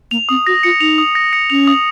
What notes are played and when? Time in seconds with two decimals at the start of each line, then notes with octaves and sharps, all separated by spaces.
0.11 A#3 F7
0.29 C4 D#6
0.47 F#4 A#6
0.63 F4 C#7
0.80 D#4 F7
0.98 D#6
1.15 A#6
1.33 C#7
1.50 C#4 F7
1.67 D#6